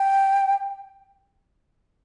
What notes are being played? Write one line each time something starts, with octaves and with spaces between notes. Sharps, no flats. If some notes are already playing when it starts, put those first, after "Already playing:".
Already playing: G5